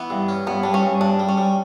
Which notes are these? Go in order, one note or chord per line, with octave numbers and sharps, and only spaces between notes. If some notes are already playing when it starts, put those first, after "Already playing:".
Already playing: E3 B3
G2
C#4
G2 B3
G3 D4
C#4
G2
G2 D4
G3
C#4
G3